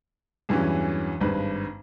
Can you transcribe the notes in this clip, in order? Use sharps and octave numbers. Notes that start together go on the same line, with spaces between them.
E2 G2 E3 F#3 C#4
G#1 G2 B4